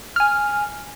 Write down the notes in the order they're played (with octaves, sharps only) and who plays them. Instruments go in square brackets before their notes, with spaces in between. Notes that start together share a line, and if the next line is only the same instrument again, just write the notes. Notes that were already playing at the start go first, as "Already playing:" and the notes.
[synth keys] G#5 F6